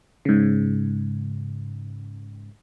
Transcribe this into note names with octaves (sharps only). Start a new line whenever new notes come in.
G#2 C#3